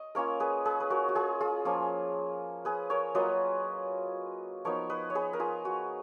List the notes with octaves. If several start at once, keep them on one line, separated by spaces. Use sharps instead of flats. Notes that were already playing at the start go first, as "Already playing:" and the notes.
Already playing: D#5
A#3 C#4 F4 A#4 C#5
G#4 B4
G#4 B4
B4
F#4 A#4
F#4
F4 G#4
F4 G#4
F3 A#3 C#4 F4
G#4 B4
A#4 C#5
F#3 A#3 F4 B4 D#5
F3 B3 D#4 A#4 C#5
B4 D#5
C#5
G#4 B4
A#4
F4 G#4
F#4